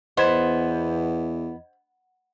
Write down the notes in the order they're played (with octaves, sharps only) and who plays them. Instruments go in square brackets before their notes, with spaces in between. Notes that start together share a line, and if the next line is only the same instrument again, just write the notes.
[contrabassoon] E2 [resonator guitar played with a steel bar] B3 [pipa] C5 [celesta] D#5 G#6 E7